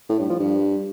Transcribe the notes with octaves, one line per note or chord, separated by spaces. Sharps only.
A2
G2
F3
G2